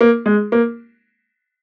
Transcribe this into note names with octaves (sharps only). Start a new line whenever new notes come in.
A#3
G#3
A#3